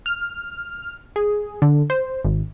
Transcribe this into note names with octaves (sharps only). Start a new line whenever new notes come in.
F6
G#4
D3
C5
G#1